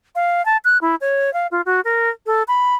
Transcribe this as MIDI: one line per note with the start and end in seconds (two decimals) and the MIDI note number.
0.15 0.44 77
0.46 0.57 81
0.65 0.78 90
0.81 0.95 64
1.01 1.33 73
1.33 1.47 77
1.51 1.62 65
1.66 1.81 66
1.85 2.10 70
2.26 2.43 69
2.48 2.75 83